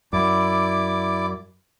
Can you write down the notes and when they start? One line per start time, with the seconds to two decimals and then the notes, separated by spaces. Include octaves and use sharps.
0.13 F#2 E4 D5 D6